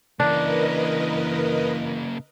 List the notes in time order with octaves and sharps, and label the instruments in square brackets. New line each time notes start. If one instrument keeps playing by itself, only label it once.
[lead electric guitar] C#3 A#3 [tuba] E3 [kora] D4 [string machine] A#4 B4 D#5